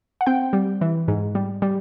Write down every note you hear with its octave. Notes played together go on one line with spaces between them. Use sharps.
F#5
C4 G5
G3
E3
G#2
G3
G3